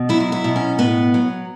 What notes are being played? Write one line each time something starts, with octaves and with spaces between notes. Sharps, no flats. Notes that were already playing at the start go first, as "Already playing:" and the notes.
Already playing: B2
F#3 E4
F#4
E4
B2
C#4
A2 B3
F#3